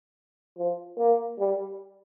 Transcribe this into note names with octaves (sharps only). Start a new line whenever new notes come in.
F3
A#3
G3